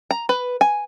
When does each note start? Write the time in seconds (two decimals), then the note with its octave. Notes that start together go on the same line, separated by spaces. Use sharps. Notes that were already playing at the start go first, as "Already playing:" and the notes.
0.11 A#5
0.29 B4
0.61 G#5